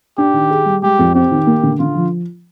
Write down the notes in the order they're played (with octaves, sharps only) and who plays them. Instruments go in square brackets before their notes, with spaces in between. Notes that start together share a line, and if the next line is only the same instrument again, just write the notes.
[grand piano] D4 [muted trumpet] G4
[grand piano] D#3
G#4
G3
[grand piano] G#3 [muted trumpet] G4
[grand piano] F2
[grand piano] C4 [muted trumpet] G4
[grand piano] D#3
A#3
D3
[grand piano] D3 [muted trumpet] F4
[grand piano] F3